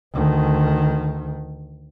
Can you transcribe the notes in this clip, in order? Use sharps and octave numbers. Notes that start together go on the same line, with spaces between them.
D2 D#3